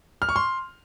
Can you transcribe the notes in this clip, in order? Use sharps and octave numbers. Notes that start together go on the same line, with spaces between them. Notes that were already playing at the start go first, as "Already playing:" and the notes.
F6
C#6
C6